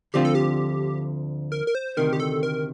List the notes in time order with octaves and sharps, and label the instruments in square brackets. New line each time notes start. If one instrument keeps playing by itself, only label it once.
[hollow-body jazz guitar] D2 D3 F3 C4 F4 [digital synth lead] G4
[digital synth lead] A4
G4
A#4
A#4
C5
[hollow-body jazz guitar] D2 C3 D#3 [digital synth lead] A#4
[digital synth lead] G4
A4
A#4